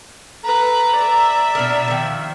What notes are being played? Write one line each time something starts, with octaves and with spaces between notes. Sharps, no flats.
A4 B4 A#5
D5 E5
B2 D4 A#4
D#3 F3